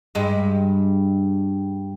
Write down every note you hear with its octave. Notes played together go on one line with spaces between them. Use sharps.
G2 G#3